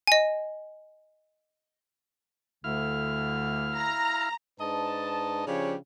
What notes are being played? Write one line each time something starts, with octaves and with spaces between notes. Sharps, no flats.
D#5 G#5
D2 D3 E4 F5 F6
A#5
G#2 D4 B4 D#5 A5
C#3 F3 C#4 D4 G4 C#5